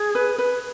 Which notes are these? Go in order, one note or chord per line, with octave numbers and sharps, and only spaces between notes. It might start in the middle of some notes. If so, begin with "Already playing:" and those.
Already playing: G#4
B4
B4